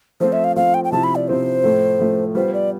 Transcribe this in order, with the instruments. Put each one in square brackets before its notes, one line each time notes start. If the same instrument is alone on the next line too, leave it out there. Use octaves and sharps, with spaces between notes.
[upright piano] F3 A3 C4 F4 [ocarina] C5
[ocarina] E5
F5
[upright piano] F3 A3 C4 F4 [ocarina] F5
[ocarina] G5
G5
[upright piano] C3 F3 C4 E4 [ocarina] A5
[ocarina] B5
D5
[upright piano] C3 F3 C4 E4 [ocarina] C5
[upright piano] A2 F3 A3
A2 F3 A3
[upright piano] G3 B3 F4 [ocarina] C5
[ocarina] D5